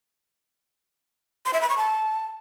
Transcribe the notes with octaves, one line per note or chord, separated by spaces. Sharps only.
C6
E5
B5
C#6
A5